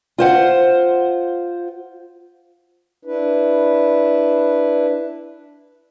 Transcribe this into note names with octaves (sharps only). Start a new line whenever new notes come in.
F4 C5 F#5
D4 E4 B4